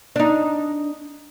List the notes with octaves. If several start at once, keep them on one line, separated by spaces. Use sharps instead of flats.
D4 D#4